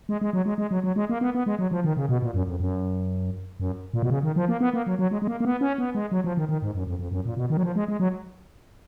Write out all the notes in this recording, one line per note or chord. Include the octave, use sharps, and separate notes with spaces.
G#3
G#3
F#3
G#3
G#3
F#3
F#3
G#3
A#3
B3
B3
G#3
F#3
F3
D#3
C#3
B2
A#2
F#2
F2
F#2
F#2
A#2
B2
C#3
D#3
F3
A#3
B3
A#3
F#3
F#3
G#3
G#3
A#3
A#3
B3
C#4
B3
G#3
F#3
F3
D#3
D#3
G#2
F#2
F2
F2
F#2
A#2
B2
D#3
F#3
F3
G#3
G#3
F#3